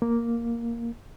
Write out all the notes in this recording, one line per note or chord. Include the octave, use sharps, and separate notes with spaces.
A#3